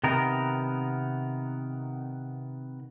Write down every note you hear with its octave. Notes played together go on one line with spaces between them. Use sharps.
C3 D#3 B3 A#4